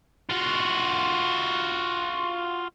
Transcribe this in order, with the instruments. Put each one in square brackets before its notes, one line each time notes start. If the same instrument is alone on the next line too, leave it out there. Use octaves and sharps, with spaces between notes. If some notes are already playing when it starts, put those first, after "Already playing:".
[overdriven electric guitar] F4 F#4